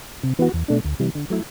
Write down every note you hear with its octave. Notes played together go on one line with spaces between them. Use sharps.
C3
E3 B3 F#4
E2
B2 A3 D4
D2
C3 E3 G3
D3
F#3 A3 E4